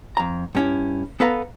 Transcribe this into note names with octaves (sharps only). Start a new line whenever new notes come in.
F2 A#5
G2 C#4 E4
B3 A4 B4 F5 A#5